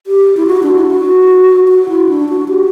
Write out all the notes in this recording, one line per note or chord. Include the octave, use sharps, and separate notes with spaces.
G4
E4
F#4
D4
E4
F#4
F#4
E4
D4
F#4
G4